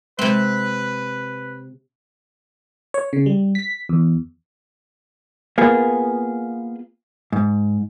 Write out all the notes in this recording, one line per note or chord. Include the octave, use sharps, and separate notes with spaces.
C3 G#3 C4 B4
C#5
C#3
G3
B6
E2
A#3 B3 F4 G#4
G#2